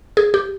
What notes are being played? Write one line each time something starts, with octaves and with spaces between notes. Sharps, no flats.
G#4
G4